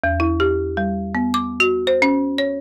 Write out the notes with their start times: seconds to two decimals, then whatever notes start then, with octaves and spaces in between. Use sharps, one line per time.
0.04 E2
0.20 E4
0.40 G4
0.77 G3
1.15 B3
1.34 D6
1.60 F#4
1.87 C5
2.02 C#4
2.38 C#5